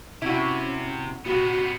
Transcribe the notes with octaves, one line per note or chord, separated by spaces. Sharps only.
C3 C#4 E4 F#4
C3 B3 F#4